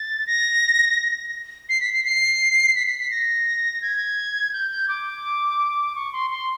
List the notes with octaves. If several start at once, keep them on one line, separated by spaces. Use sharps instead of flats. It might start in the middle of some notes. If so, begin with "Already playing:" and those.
Already playing: A6
A#6
C7
B6
C7
C7
B6
B6
B6
A#6
G#6
G6
G6
D6
C#6
C6
C6